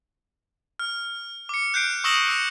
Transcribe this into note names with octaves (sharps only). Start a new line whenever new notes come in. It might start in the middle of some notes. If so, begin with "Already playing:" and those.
F6
D6 C#7
F#6 G6 C7 D7
C#6 D#6 E6 A#6 E7 F#7
E6 C#7